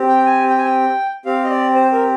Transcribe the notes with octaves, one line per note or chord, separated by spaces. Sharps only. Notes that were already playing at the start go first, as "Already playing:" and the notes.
Already playing: C4 G4
G5
G#5
G5
G#5
G5
C4 G4 F5
D#5
D5
C5
A#4